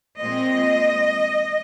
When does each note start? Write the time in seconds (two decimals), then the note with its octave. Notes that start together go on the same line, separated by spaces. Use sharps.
0.20 A#2 G#3 C4 D#5